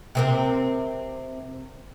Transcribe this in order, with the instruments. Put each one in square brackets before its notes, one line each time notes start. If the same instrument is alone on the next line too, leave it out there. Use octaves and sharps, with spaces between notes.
[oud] C3 C4 A#4